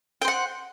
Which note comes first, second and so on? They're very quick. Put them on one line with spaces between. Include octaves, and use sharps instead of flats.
G5 C5 F#5